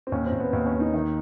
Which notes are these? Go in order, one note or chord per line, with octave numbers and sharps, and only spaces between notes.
C4
D#2 C#4
C4
D#2
B3
D#2 C4
C#4
D#2
D#4
D#3